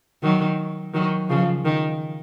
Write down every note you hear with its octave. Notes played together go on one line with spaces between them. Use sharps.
D#3 F#3
D#3 F#3
C#3 F3
D#3